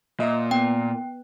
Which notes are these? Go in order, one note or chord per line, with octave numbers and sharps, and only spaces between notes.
A#2 D#5 E5
B3 G5